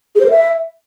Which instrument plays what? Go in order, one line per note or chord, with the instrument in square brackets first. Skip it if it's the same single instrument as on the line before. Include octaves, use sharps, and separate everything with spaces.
[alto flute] G#4
C5
A#4
E5